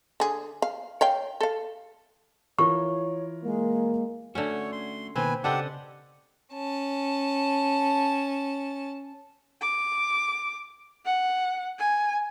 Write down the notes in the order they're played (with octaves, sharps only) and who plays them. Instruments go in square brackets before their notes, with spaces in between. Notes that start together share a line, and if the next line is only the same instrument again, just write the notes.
[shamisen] D3 G#4
F5
C#5 F5 G5
A4 F5
[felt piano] E3 F4 A#4 [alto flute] C#5 [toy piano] C#6
[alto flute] G#3 [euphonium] A#3
[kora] D3 C#4 [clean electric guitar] A3 F#4 [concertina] C#5
[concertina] C6
[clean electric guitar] B2 D#3 A#3 [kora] C4 [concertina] B4 G#5
[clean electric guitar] C#3 D#5 C6 [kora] D4 A4 [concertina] G4 F#5
[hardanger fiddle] C#4 A5
[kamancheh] D6
F#5
G#5